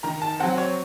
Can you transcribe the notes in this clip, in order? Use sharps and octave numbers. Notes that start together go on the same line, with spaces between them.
D#3 A#5
A5
F#3 C4 F#5
C#5